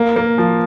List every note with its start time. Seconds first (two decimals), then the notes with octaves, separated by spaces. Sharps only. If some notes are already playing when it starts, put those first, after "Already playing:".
Already playing: A#3
0.16 A#3
0.38 F3